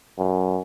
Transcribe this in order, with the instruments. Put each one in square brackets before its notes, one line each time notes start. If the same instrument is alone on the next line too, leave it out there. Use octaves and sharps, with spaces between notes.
[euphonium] F#2